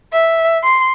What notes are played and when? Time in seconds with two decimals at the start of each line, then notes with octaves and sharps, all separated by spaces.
0.12 E5
0.63 C6